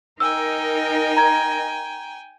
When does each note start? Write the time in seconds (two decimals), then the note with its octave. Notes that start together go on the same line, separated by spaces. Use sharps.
0.20 D#4 A#4 G5 G#5 E6
1.17 A#5 G#6